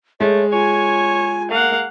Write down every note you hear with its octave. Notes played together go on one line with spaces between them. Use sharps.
G#3 A3 C#5
F4 C#5 G#5
A#3 F5 F#5